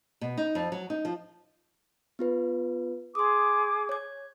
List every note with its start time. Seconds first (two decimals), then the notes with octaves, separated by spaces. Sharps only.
0.21 B2
0.37 D#4
0.55 F2
0.72 F#3
0.90 D#4
1.05 F3
2.19 B3 F4 B4
3.15 G#4 C6 D6 D#6
3.89 C#5 G#6